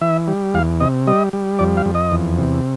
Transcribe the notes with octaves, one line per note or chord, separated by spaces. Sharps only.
E3 E5
G3
E2 F5
C3 D#5
G3 D#5
G3
F2 D5
F5
F2
D#5
E2
C3